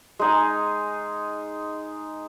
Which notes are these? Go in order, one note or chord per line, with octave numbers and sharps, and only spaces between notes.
G#3 D#4 G#5